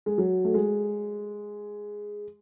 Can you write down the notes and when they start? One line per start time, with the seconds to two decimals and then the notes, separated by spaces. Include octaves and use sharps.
0.06 G#3
0.18 F#3
0.45 A3
0.54 G#3